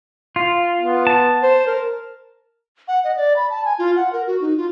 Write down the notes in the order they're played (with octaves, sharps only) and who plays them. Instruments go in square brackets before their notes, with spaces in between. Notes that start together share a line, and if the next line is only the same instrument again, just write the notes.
[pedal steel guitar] F4
[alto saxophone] B3
[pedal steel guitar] A5
[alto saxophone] C5
A#4
[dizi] F#5
D#5
D5
B5
A5
G#5
F4
F#5
A#4
F#4
D#4
F4